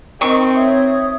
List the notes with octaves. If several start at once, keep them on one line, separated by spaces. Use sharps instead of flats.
D#3 C4 C#6
C#5 E5 D#6